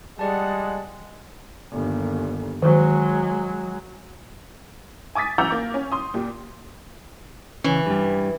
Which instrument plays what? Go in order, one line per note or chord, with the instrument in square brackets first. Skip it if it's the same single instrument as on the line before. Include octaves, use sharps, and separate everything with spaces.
[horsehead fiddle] G3 F#5 [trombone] G#3 [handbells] G#4 D5 A5
[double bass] G1 D#2
[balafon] D#3 [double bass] F#3 G#3
[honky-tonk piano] G#5 D6 D#6 A6 B6
E3 F#5 A#5 D6 E6 G6
A#3 D6
C#4
C6 D#6
A#2 G4
[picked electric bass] C#3 C#4 [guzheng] E3
[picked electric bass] G2 G3